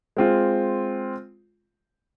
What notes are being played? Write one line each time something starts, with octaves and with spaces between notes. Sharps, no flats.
G#3 C4 F4